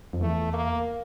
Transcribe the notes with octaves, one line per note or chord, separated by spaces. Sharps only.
F2
E2 A3
A#3